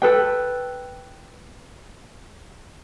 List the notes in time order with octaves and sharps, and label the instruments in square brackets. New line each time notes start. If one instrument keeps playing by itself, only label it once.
[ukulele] A4 B4 G5